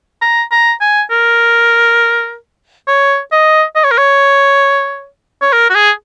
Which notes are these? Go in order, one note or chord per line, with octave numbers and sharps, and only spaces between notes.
A#5
A#5
G#5
A#4
C#5
D#5
D#5
C#5
A#4
C#5
C#5
A#4
F#4
G#4